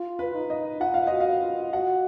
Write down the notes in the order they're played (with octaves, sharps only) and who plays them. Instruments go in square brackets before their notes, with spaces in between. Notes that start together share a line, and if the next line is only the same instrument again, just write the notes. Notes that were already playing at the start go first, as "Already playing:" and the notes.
Already playing: [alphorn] F4
[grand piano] B4
[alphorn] D#4
[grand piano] D#5
[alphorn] F4 [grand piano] F#5
[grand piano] F5
[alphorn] F#4 [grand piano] D#5
[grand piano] F5
[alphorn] F4
[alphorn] F#4 [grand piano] F#5